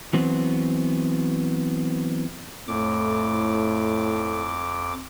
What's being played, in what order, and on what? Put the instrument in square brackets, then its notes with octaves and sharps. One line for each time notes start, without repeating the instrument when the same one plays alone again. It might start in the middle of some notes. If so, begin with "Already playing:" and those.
[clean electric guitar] E3 F#3 B3 C4
[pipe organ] F2 D6 [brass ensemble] A2